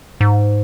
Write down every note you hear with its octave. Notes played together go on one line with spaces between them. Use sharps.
G#2